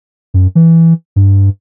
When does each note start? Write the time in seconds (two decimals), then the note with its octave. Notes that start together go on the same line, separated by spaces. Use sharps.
0.34 F#2
0.55 E3
1.16 G2